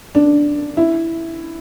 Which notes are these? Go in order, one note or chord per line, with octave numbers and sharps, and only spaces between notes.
D4
E4